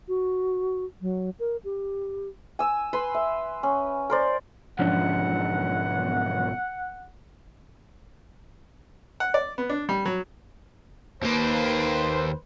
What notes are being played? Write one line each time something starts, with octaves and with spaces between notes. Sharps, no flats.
F#4
F#3
A#4
G4
G#5 E6
B4 B5 C6
E5
C#4
A#4 C5 D5
B1 G#2 F3 C#4 D4 F#5
F#5
D5
B3
D4
G3
F#3
D#2 A#3 B4 C5